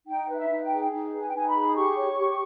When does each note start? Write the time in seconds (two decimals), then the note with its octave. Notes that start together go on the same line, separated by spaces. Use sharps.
0.07 D#4 G5
0.28 B4
0.35 E5
0.49 D#4
0.63 G5
0.70 G#4
0.91 D#4
1.13 B4
1.20 G#5
1.28 G5
1.34 D#4 G#5
1.48 B5
1.55 G#4
1.67 D#6
1.76 G4 C#6
1.97 C#5
2.17 G4